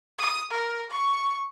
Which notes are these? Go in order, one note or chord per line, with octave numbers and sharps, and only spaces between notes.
D#6
A#4
C#6